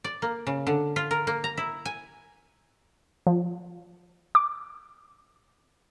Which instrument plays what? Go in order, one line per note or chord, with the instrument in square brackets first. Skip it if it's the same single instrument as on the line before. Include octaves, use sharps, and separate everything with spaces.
[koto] D5
A#3
C#3
D3
F4
A#4
A#3
A#5
E4
G#5
[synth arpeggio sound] F3
D6